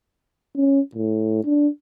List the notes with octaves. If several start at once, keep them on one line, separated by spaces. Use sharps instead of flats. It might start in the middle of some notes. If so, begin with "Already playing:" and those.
C#4
A2
D4